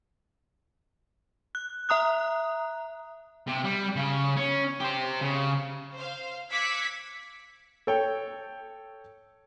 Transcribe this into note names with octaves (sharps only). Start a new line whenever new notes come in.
F#6
E5 A#5 D#6 F#6
C3
G3
C#3
C#4
G4 C5
C#3
C5 F5
D6 E6 F#6 G#6 B6 C#7
A4 C#5 G5